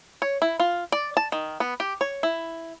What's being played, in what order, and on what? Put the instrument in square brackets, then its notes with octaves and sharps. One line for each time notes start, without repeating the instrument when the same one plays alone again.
[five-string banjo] C#5
E4
F4
D5
A5
D#3
B3
G4
C#5
E4